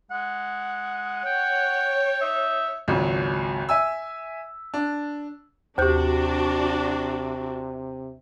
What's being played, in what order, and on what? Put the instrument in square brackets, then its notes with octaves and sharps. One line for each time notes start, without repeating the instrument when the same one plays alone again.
[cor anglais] G#3 [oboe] F#5
[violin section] C#5 [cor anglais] G5
[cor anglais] D#4 [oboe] E5
[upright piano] G#1 C#2 F#3
E5 G#5 E6
D4
[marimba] D#2 G6 [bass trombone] C3 [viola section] D4 F#4 [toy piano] G4 C5